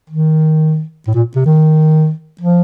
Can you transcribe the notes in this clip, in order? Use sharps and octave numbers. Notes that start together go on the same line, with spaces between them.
D#3
A2
A#2
C3
D#3
F3